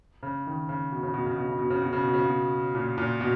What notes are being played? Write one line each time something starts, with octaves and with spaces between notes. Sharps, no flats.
C#3
D#3
C#3
B2
C#3
B2
C#3
B2
C#3
B2
C#3
B2
C#3
B2
C#3
B2
A#2
A#2
B2